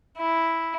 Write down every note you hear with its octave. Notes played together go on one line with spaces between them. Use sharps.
E4